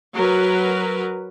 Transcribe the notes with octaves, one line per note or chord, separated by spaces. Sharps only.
F#3 A#4 B4